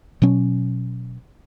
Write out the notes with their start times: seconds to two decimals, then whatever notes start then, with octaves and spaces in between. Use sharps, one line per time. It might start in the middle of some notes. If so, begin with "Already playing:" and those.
0.22 B2 F#3 C#4